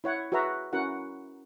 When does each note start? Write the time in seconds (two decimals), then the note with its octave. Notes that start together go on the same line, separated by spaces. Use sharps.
0.04 E4 C#5 F#5 C#6
0.32 F#4 G#4 B4 E5 A#5
0.73 C#4 E4 F#4 A#4 F#5